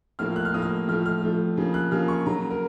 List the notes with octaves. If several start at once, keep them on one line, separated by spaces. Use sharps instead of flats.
A2 F3 A#3 F6
F#6
F6
A2 F3 A#3 D#6
F6
A2 F3 A3 F6
F6
A2 F3 A3
C#3 F3 A#3
F#6
C#3 F3 A#3 F6
C#6
C#3 F#3 A#3 A#5
A#4